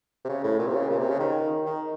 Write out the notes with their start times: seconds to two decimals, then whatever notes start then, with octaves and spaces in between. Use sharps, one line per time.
0.25 C3
0.29 C#3
0.44 A2
0.59 A#2
0.67 C3
0.74 C#3
0.89 A#2
0.99 C3
1.09 C#3
1.19 D#3
1.66 D#3